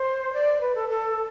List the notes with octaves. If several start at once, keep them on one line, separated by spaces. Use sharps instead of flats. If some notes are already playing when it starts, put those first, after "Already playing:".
Already playing: C5
D5
B4
A4
A4